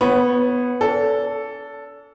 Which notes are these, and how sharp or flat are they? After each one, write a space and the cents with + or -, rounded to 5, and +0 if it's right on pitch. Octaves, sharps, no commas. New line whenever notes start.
B3 +0 C#5 -20 B5 -25
D4 -45 A4 +0